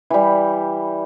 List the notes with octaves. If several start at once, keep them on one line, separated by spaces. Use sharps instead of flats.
E3 G3